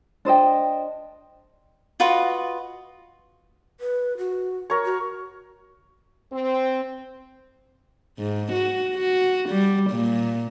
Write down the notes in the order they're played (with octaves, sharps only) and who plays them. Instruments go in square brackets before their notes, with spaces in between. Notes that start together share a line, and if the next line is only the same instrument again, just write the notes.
[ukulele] D4 C5 D#5 G5
[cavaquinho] F4 F#4 B4 D#5
[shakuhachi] B4
F#4
[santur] A#4 C#5
[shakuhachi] F#4
[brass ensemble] C4
[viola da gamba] G#2
F#4
F#4
G3
A#2